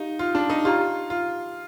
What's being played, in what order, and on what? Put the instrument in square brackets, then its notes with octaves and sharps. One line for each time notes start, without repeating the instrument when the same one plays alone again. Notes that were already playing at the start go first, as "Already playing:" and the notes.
Already playing: [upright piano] D#4 [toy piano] G4 F5
[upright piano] F4
D4
D#4
[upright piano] F4 [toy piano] G4 D5 G5 A#5
[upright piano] F4